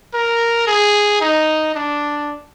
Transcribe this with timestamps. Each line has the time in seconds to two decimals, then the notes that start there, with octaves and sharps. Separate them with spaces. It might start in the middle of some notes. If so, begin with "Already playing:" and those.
0.14 A#4
0.67 G#4
1.21 D#4
1.75 D4